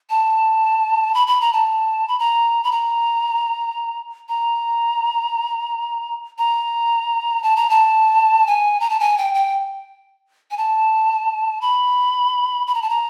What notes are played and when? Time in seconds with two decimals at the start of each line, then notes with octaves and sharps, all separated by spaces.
0.10 A5
1.14 B5
1.27 B5
1.41 A#5
1.53 A5
2.08 B5
2.19 A#5
2.64 B5
2.72 A#5
4.29 A#5
6.38 A#5
7.43 A5
7.56 A#5
7.70 A5
8.47 G#5
8.80 A#5
8.90 A5
9.00 G#5
9.18 G5
9.34 G5
10.51 G#5
10.57 A5
11.61 B5
12.67 B5
12.74 A#5
12.82 A5
12.90 A#5